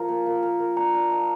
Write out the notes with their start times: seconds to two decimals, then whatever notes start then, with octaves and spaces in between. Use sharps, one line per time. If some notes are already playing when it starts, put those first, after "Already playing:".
Already playing: F3 A#4 A#5
0.08 A#3
0.26 A#3
0.43 A#4
0.60 A#4
0.76 D4 A#5
0.94 D4
1.11 D#5